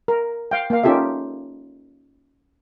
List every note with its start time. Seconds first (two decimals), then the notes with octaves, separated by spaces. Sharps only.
0.08 A#4
0.51 F5 G5
0.70 A#3 F5
0.83 C#4 D#4 F4 G4 A4 E5